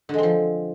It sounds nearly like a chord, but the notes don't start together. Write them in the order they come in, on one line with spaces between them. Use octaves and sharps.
D3 G#3 C4 F3